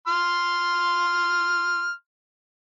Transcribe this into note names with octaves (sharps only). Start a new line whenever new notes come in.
C6 F6